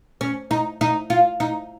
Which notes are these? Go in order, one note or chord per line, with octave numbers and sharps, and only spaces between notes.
C#4
D#4
D#4
F4
D#4